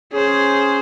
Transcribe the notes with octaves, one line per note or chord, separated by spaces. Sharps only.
C#4 G#4 C5